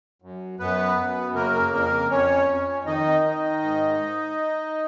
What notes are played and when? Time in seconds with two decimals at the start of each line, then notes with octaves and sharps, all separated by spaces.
0.22 F#2
0.59 F#2 B3 B4
0.98 F#2
1.35 C#3 A#3 A#4
1.72 F2 A#3 A#4
2.10 F2 C#4 C#5
2.48 F2
2.86 D#3 D#4 D#5
3.24 D#3
3.62 G#2